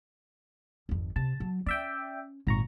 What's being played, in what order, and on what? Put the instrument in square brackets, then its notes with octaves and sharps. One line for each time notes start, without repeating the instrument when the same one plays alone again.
[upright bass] G#1 F2
[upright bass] C3 [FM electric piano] A5
[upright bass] F#3
[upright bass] C#4 [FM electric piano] D5 E5 G5
[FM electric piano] G#1 A#5 C#6 [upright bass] A#2